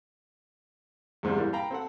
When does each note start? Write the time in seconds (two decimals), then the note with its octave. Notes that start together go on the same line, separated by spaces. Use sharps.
1.23 E2 G#2 C3 G3
1.38 E3 G3 A#3
1.53 F5 G5 A#5 B5
1.71 C4 A4 F#5